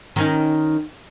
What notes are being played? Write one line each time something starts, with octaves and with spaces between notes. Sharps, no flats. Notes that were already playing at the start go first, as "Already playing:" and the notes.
D#3 C#4 D#4